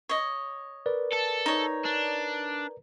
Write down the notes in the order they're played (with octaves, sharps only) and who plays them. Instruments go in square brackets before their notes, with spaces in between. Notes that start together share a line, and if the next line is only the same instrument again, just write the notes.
[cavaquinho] C#5 D#5
[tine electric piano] A#4 B4 D5
[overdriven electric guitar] A4
[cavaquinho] D#4 C#5
[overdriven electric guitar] D4